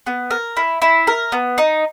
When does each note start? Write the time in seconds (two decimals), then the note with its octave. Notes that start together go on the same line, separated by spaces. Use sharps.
0.07 B3
0.31 A#4
0.57 E4
0.82 E4
1.07 A#4
1.32 B3
1.58 D#4